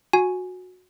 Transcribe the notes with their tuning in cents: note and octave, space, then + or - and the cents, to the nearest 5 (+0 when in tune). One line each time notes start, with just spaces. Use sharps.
F#4 -20 G#5 +0